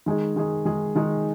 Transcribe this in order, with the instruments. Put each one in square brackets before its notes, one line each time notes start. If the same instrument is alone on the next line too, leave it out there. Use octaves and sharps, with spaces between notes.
[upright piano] D#3 G#3 D#4 G#4
D#3 G#3 D#4 G#4
D#3 G#3 D#4 G#4
D#3 G#3 D#4 G#4